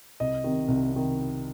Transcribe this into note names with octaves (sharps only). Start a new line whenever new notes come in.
C2 D#5
C3 D#3
C2
C3 D#3